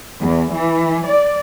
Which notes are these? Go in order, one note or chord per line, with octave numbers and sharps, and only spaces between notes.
E2
E3
D5